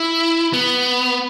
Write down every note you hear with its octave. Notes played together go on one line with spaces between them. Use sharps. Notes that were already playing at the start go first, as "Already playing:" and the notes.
Already playing: E4
B3